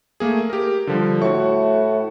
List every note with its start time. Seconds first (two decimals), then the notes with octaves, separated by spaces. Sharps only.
0.20 A3 A#3 G#4
0.50 G4 A#4
0.87 D3 F3 G3
1.22 A2 F#4 C#6